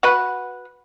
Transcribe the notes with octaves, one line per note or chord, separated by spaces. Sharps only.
F#4 B4 F#5